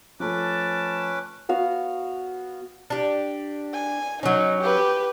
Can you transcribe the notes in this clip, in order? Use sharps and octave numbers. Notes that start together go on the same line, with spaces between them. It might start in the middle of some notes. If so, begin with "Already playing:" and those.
F3 A3 C#4 B4 A5 D6
B3 F#4 F5
D4 G4
G#5
F#3 C#4 D#4
G4 B4